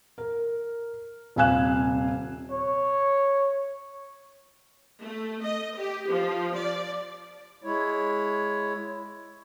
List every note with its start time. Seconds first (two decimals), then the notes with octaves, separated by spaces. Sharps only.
0.18 A#4
1.36 D#1 C3 F5 G#5 F#6 E7
2.51 C#5
5.03 A3
5.46 D#5
5.79 G4
6.12 F3
6.57 D5
7.64 G#3 E4 C#5